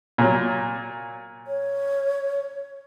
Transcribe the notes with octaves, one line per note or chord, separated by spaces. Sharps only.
A#2 F#3
C#5